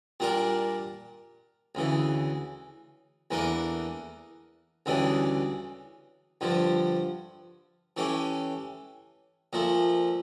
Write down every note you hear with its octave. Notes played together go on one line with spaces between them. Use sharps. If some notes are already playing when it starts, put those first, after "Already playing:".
A#2 G3 D4 F4 A#4
D2 C#3 E3
E2 E3 A#3 D4 A4
D2 C#3 E3 G3 D4
G2 D3 F3
E3 A3 C#4 G4
A#2 F3 A3